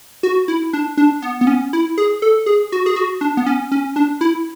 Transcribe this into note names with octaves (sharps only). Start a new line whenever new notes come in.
F#4
E4
D4
D4
B3
B3
C#4
E4
G#4
A4
G#4
F#4
G#4
F#4
D4
B3
C#4
C#4
D4
E4